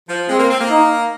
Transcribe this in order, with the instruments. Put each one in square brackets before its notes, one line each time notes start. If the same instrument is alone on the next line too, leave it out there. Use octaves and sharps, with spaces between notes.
[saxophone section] F3
[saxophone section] G#3 [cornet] C4
[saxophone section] A#3
C4
A#3
[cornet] D#4